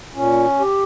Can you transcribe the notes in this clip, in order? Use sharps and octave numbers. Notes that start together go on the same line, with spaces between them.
A#2 C#4
G4